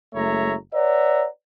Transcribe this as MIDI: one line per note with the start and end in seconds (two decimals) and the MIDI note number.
0.14 0.54 30
0.14 0.54 56
0.14 0.54 57
0.14 0.54 73
0.14 0.54 76
0.14 0.54 82
0.74 1.25 71
0.74 1.25 73
0.74 1.25 74
0.74 1.25 76
0.74 1.25 78
0.74 1.25 82